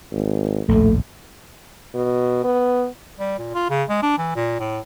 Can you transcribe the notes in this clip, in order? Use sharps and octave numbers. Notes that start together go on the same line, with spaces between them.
G#1
A#1 D#2 A2 A3
B2
B3
G3
A#2
F4
C#3
G#3
D4
E3
A#2
A2